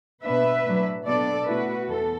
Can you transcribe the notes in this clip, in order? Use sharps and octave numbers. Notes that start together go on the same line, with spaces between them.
B2 B3 D4 B4 E5
A2 F#3 D4
B2 B3 D4 A4 D5
B2 A3 E4 F#4 B4
E2 E3 A4